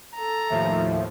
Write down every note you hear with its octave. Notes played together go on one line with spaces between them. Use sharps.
A4 A#5
D#2 A2 F3 E5